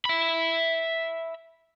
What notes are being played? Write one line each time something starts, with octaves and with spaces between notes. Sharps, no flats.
E5 B5